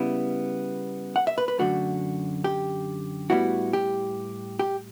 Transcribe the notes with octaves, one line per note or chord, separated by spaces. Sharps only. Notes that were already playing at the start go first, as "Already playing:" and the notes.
Already playing: C#3 G3 B3 E4
F#5
E5
B4
B4
F#2 D3 A3 F#4
G4
A2 G3 B3 E4 F#4
G4
G4